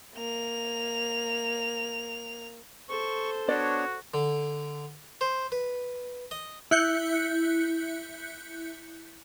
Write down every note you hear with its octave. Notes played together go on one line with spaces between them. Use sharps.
A#3 F7
A4 C5 C#6
B3 D4 F#4 C#5 D5
D3
C5
B4
D#5
E4 F#6 G6 C#7